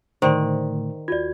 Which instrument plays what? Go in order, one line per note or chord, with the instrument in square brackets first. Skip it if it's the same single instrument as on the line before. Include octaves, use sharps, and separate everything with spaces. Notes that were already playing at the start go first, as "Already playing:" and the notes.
[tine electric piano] A2 D3 A3 [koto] D#3 [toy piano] C5 D5 C6
[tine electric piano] D#2 F#4 G#6 [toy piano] F4 D5